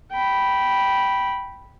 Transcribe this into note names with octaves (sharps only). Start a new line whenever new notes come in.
G5 B5